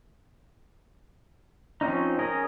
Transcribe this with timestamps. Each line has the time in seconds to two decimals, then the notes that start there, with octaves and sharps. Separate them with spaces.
1.81 F3 C4 C#4 D#4
2.19 C#4 G#4 A#4 D#5